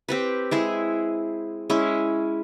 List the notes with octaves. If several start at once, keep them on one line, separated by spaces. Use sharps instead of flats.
C4 G4 B4
G#3 E4 G#4
G#3 C#4 E4